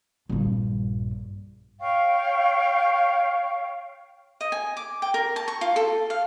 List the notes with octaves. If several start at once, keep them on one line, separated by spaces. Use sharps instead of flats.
A#1 G2
C#5 F5 G5 C#6
D#5
G#5
D6
G5
A#4
A5
C#6
F4
A4
F5